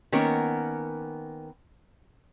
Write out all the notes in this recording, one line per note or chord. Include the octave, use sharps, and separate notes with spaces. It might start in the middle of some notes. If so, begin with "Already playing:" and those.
D#3 A#3 B3 C#4 A#4